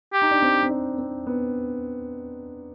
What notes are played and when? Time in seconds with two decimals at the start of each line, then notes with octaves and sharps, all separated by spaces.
0.14 G4
0.22 D#4
0.31 D4
0.42 C4
0.63 C4
0.70 D4
0.98 C4
1.26 B3